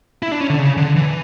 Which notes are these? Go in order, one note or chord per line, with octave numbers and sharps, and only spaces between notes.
E4
D4
C#4
D3
C#3
D3
E3